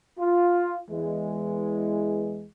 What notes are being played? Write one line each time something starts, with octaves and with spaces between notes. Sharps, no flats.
F4
E2 E3 G#3